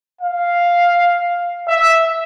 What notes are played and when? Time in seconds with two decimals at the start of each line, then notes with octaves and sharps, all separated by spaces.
0.21 F5
1.68 E5